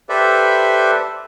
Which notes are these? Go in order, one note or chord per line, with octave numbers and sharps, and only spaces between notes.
G4 A4 B4 C5 D5 E5